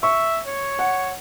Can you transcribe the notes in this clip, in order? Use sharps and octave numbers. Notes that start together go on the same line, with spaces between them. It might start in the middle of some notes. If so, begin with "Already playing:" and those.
E5 C#6
C#5
F#5